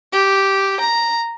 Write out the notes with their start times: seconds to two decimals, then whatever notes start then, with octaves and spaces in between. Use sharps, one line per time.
0.12 G4
0.80 A#5